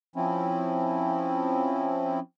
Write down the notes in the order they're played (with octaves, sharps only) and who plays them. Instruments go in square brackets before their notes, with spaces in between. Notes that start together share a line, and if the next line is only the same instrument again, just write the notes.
[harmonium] F3 C4 C#4 E4